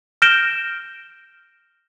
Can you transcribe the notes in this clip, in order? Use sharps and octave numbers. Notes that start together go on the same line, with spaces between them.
F6 G6 A#6 D7 E7 G7